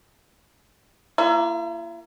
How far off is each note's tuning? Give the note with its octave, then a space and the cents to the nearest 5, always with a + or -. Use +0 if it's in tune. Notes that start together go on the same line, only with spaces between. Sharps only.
A#3 +0 E4 +40